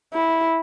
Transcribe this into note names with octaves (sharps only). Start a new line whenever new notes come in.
E4